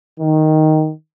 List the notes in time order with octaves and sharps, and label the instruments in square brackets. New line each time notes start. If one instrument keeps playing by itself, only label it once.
[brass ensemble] D#3